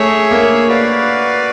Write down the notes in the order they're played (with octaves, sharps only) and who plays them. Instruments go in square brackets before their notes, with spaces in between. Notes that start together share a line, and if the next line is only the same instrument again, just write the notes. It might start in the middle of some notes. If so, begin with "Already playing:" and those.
Already playing: [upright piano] A3 [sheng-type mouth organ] G#4 C#5 E5
[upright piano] A#3
[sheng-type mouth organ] F#4 B4 D5 F5